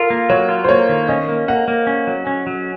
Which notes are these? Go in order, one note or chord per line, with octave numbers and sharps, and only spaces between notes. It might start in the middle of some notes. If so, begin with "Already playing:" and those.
Already playing: F4 A4 A#4
A#3
F#3 C#5
F4
C5
A#3 C#5
D#3
C#4 D#5
A#3
A#3 F#5
A#3
C#4
F#3
C#4
F#3